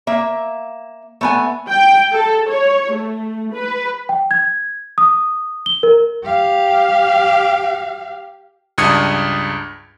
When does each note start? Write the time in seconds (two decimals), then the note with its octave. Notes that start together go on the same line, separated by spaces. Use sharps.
0.07 A#3 E5
1.21 A3 B3 G#5
1.67 G5
2.12 A4
2.49 C#5
2.94 A3
3.52 B4
4.09 G5
4.31 G#6
4.98 D#6
5.66 G7
5.83 A#4
6.24 G4 F5
8.78 C#2 G2 D4 D#6 G#6 C#7